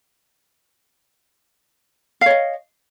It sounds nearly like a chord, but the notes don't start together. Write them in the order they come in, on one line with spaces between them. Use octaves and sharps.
F5 C#5 D#5